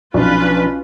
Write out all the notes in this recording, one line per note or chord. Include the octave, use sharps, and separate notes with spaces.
B1 F3 C#4 D4 F4 B4